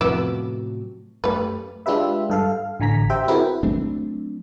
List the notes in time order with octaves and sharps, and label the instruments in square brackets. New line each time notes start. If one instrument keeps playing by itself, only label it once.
[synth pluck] F2 D6 E6 [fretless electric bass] A2 C3 F#3 [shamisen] B3 E4
[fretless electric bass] F#2 A3 [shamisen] G3 B4
[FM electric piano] G#3 D4 F4 G4 B4 E5
G2 A4 F5
F5
A1 D3 G#5 A#5 B6
G4 C5 E5 G5
C4 E4 F#4 G#4 A#4 B4
[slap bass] F#3 A3 C4 D4